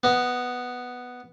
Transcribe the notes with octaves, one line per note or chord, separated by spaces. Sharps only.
B3 D#5